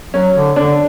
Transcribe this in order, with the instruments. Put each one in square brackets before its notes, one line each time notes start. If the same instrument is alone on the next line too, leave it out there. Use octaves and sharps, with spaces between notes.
[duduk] F#3 [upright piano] C#4
[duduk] D3
[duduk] D3 [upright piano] D4